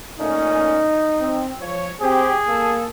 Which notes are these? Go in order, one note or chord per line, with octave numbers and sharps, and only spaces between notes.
A#2 A3 C#4 D#4
C4
F3 C#5
C4 G4 G#4
A#3 A4